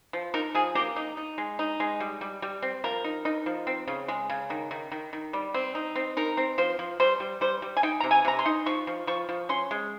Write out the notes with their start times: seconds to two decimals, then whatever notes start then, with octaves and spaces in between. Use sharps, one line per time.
0.13 F3
0.34 D#4 A#4
0.55 F3 G#4
0.75 A#3 G4
0.96 D#4
1.17 D#4
1.38 G#3
1.59 D#4
1.80 G#3
2.00 G3
2.21 G3
2.42 G3
2.62 C4
2.84 F3 A#4
3.04 D#4
3.25 D#4
3.46 F3
3.67 C4
3.88 C#3
4.08 G#3
4.30 C#3
4.50 D#3
4.71 D#3
4.92 D#3
5.13 D#3
5.33 G3
5.54 C4
5.75 D#4
5.95 C4
6.17 D#4 A#4
6.37 C4
6.58 F3 C5
6.79 F3
7.00 G3 C5
7.20 G3
7.41 G3 C5
7.62 G3
7.77 G#5
7.83 D#4 G5
8.00 C3 A#5
8.11 G#5
8.25 C3 A#5
8.39 C6
8.46 D#4
8.66 F3 C#6
8.87 F3
9.07 F3 C#6
9.29 F3
9.49 C#4 C6
9.71 G#3